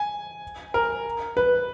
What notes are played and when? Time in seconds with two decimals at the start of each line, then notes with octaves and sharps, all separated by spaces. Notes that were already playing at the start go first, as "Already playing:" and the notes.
Already playing: G#5
0.74 A#4
1.37 B4